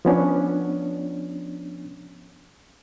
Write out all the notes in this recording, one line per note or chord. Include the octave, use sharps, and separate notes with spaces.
F3 B3 C#4 D4